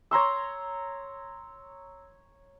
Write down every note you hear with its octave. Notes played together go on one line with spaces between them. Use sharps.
C#5 A#5 C6 E6